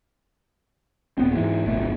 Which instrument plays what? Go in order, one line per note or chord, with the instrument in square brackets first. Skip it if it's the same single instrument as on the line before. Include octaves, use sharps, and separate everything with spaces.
[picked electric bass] D#1 B3 C4
G#2 E3
D1 G1 B2 A3